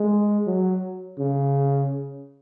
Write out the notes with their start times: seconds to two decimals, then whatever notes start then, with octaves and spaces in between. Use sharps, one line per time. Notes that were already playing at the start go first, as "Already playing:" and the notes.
Already playing: G#3
0.47 F#3
1.18 C#3